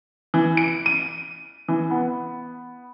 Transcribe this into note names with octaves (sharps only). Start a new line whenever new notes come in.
E3
D7
D#7
E3
B3